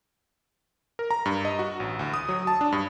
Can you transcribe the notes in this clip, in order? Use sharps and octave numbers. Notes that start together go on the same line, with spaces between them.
A#4
A#5
G2
D#5
F#4
A1
D2
D#6
F#3
A5
D4
G2